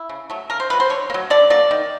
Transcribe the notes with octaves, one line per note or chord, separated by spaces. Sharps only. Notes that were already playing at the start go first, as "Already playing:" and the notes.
Already playing: E4
C#3
F#3 A3
C#3 A#4
C5
A3 B4
F#3
C5
D3 C#5
A#3
F#3
D3 D5
F#3 A#3 D5
D#3